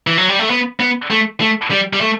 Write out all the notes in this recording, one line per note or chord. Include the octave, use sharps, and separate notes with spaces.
E3
F#3
G3
A3
B3
B3
A3
A3
G3
G3
A3